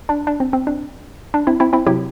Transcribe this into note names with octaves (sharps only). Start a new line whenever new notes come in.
D4
D4
C4
C4
D4
D4
C4 E4
C4 E4
C4 E4
C3 F#3 E4 G4